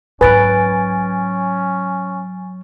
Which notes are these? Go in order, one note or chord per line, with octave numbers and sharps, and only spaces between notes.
G#2 F#3 C#4 B4 G#5 A6 D7